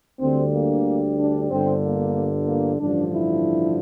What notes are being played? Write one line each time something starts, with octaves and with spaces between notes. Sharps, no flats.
D2 D3 G3 C4
A#3
D4
G1 G2 D3 C4
A#3
A#3
A1 G2 D3 F3 D4
E4